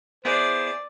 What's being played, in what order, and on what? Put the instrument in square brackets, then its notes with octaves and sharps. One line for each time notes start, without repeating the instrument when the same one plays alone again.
[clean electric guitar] B3 E4 G#4 [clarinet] C5 [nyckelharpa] D5